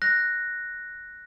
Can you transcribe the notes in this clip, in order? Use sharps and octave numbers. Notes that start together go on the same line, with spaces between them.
F#6 A#6